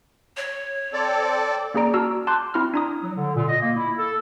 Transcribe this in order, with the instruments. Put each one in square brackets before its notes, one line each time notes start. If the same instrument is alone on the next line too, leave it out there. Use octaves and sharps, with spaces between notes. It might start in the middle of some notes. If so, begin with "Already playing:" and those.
[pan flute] C#5
[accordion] C4 A4 D5
[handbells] A#3 C#4 G#4 D5 A#5 D7
F#4 A5 A#5 E6 F6
A5 C6 D6 F#6 G6
C4 E4 C6 F6
D4 A#5 D#6
[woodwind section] F#3
D3
A#2
D#5
A#3
E4
A4